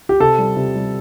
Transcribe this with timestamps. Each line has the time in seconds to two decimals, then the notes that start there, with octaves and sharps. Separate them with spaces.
0.09 G4
0.20 C3 A4
0.38 G3
0.56 C3
0.75 G3